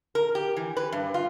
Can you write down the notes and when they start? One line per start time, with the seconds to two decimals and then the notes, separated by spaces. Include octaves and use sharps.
0.15 A#4
0.35 G4
0.57 E3
0.77 B4
0.93 G2
1.14 F4